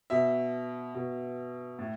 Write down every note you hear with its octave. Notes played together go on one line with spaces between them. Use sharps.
B2 E5
B2
A2